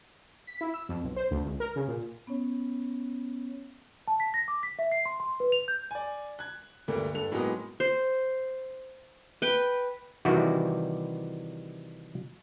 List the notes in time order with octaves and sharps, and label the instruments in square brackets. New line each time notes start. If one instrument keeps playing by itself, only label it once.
[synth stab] B6
E4
E6
F2
B1
C5
D2
C#2
A#4
C#3
A#2
[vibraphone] B3 C#4 C#5
[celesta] A5
B6
A#6
D6
B6
E5
C7
C6
C6
B4
F7
G6
[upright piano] D5 G#5
F#6 G#6
D2 G2 A3 A#3
G2 A4 F7
A2 F#3 G#3 A#3 B3 D#4
[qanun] C5
B4 G5
[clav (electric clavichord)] C3 D#3 E3 G3 E4 F#4